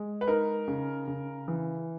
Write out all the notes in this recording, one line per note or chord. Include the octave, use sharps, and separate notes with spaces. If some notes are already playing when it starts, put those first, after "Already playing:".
Already playing: G#3
B4
D#4 A#4
C#3
C#3
E3